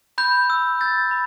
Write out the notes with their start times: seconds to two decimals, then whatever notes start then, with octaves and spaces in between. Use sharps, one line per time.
0.18 B5 G6
0.50 E6
0.81 G6 A6
1.11 B5